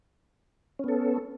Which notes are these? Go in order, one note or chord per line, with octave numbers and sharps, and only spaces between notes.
B3 C#4 A4